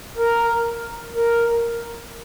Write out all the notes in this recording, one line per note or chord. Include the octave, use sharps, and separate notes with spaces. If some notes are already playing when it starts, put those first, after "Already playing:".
A#4
A#4